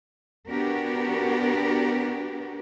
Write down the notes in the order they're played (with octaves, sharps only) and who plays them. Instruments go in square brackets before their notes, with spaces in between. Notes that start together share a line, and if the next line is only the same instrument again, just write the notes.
[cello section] B3 D4 F#4 G4 A#4